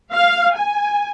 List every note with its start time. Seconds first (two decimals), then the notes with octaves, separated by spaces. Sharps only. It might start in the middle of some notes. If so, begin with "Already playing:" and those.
0.12 F5
0.56 G#5